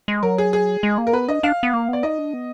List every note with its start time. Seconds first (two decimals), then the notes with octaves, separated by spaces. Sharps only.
0.08 G#3
0.23 F#3 A#4
0.38 G#4
0.53 G#4
0.83 G#3
0.98 A#3
1.07 A#4
1.13 B3 B4
1.28 D4 D#5
1.43 D4 F5
1.63 B3
1.73 A#3
1.88 B3 D5
2.03 D#4 D#5
2.18 D4
2.34 B3